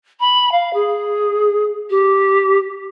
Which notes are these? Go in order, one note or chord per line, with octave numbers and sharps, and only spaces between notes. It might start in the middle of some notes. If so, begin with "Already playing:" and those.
B5
F5
G#4
G4